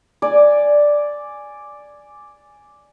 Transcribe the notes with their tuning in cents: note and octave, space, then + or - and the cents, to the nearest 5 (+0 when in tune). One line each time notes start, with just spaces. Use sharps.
D5 +0 G#5 +0